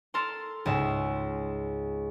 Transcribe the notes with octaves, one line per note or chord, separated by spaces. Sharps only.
A4 A#4 C6
C#2 G#2 E5